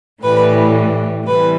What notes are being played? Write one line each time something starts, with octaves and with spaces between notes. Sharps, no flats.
A2 E3 G3 B4
C3 E3 G3 B4